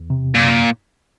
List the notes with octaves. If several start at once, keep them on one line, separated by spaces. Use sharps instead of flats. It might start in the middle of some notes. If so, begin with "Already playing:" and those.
Already playing: E2
C3
F#2 A#2